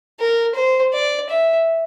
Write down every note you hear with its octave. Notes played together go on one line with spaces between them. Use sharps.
A#4
C5
D5
E5